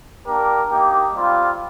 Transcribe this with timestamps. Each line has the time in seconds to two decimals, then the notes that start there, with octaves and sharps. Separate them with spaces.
0.25 A#3 D4 G4 A#4
0.70 A#3 D#4 G4
1.15 G3 C4 F4